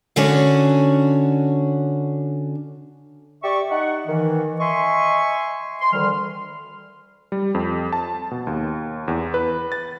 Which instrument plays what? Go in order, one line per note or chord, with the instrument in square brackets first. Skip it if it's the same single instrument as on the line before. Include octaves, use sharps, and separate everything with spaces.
[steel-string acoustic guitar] D3 C#4 D4 F#4 C#5
[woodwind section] G4 D5 E5 C#6
D#4 D#5 F#5
D#3 E3
D#5 E5 G#5 C6 C#6
C6
D2 D#3 E3 G3 F6
[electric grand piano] G3
F2
A5
B2
D#2
E2
B4
A6